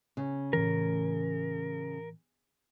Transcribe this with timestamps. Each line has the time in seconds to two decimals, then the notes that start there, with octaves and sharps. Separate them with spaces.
0.17 C#3
0.53 A2 E3 A#4